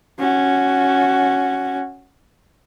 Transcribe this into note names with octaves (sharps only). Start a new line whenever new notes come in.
C#4 F#4